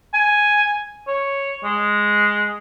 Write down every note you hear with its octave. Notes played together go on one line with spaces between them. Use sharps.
G#5
C#5
G#3